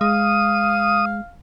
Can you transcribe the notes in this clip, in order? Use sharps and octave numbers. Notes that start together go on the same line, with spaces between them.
G#3 F5 D#6